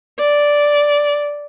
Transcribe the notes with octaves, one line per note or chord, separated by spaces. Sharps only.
D5